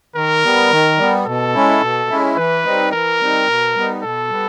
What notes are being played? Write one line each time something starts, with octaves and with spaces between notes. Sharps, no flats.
D#3 A#4
G3 B3
D#3
G3 B3
B2 A4
G#3 C#4 E4
B2
G#3 C#4 E4
E3 B4
G3 C4 D#4
E3 A#4
G3 C4 D#4
B2
G3 B3 D#4
B2 A4
G3 B3